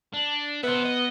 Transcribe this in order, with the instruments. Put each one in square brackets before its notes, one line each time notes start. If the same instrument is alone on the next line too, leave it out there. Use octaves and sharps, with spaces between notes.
[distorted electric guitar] D4
[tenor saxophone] B3 [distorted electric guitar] C5 E5
[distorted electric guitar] D#5